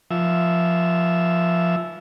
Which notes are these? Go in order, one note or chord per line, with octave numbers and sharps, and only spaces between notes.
F3 E5